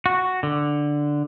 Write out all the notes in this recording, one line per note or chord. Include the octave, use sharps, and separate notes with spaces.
F#4
D3